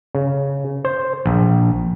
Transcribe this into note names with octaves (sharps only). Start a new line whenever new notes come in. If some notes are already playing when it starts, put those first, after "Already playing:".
C#3
C5
A#1